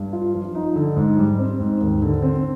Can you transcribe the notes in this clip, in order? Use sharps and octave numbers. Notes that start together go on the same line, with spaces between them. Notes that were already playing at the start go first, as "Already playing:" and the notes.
Already playing: G2
F4
F3
D#4
D3
G#2
G3
C4
G#2
D#2
D3
C4